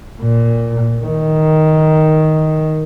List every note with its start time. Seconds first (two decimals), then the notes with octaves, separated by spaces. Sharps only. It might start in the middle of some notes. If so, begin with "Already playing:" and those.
0.21 A#2
1.05 D#3